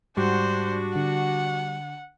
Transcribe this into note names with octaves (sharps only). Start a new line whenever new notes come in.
G#2 G3 D4 F#4 C5
D3 F#5